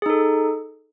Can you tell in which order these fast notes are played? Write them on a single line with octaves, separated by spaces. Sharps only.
G#4 D#4 A4